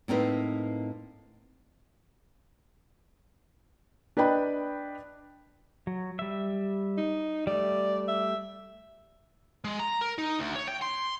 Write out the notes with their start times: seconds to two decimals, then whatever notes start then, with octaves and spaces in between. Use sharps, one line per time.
0.08 A2 A#3 C4 D#4 B4
4.17 D4 B4 D#5 G5 B5
5.87 F#3
6.19 G3 E5
6.97 D#4
7.47 G3 A3 D5
8.08 E5
9.65 G#3
9.80 A#5
10.01 A#4
10.18 D#4
10.39 D2
10.56 C#5
10.67 G5
10.82 C6